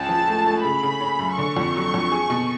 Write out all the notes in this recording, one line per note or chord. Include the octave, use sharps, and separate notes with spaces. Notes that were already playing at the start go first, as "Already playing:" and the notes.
Already playing: C#2 C#4 A5
F3
A3
A3
C#3 B5
C#3
C#4
F#2
D3 C#6
F2
F#3
F2
G#4
B2